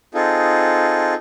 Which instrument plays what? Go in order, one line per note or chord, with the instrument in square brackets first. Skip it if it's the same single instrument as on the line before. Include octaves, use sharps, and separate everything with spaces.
[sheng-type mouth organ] C4 D#4 F4 G#4 A4